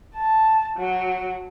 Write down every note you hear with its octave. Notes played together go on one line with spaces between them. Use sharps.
A5
F#3